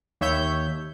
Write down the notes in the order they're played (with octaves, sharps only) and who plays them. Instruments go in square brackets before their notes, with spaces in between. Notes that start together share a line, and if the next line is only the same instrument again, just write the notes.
[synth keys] D#2 C#5 E5 G6